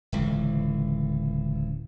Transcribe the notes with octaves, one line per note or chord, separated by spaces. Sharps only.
D1 C#2 E3